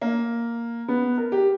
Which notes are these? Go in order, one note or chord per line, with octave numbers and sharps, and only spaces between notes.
A#3
B3
A#4
G4